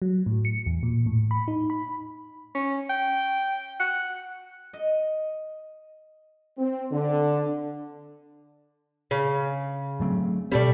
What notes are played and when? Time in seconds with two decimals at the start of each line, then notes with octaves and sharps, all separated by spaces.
0.02 F#3
0.26 A2
0.45 C#7
0.66 E2
0.83 A#2
1.06 A2
1.31 B5
1.48 D#4
1.70 B5
2.55 C#4
2.90 G5
3.80 F#5
4.73 D#5
6.57 C4
6.91 D3
9.11 C#3
10.00 F#3 A3 C4
10.52 B2 G3 A3 C4 D5